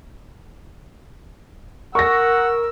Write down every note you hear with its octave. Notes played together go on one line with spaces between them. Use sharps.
A#4 F#5 C#6 E6 A#6